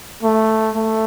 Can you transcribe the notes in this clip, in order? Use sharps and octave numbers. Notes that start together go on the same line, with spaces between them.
A3
A3